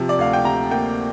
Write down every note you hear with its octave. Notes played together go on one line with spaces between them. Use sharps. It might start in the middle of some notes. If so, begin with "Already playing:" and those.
Already playing: C3 F3
D5
D2 F5
G5
C3 A#5
A#3 G5